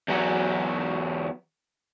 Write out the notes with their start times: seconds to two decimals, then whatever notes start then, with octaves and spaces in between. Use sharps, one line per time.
0.08 E2 F#3